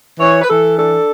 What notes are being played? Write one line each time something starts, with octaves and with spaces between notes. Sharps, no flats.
E3 C#5
B4
E3 A4
D4 A4